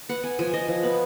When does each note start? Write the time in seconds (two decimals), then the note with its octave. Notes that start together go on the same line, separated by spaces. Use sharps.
0.09 B3 F#5
0.23 B3 G#5
0.39 F3 G#5
0.53 F3 D#5
0.68 F3
0.83 B3